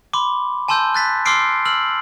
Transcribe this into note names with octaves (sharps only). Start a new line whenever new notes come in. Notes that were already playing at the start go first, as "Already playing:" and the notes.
B5 C6 D6
G#5 A5 C6 E6 G6
F#6 A6 B6
C6 D6 E6 F6 C7 D7
E6 F6 F#7